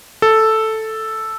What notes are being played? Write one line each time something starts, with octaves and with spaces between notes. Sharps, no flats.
A4